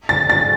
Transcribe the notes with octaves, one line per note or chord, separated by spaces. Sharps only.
A6
A6